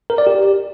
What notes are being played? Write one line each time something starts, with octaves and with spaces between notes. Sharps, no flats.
A#4
D5
G4